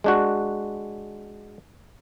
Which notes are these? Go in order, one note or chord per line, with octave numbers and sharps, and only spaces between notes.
G#3 D4 F#4